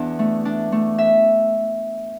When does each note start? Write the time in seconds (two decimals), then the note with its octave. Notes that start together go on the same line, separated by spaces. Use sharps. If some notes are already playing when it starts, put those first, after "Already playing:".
Already playing: E2 D4 E5
0.19 A3
0.45 D4
0.72 A3
0.98 E5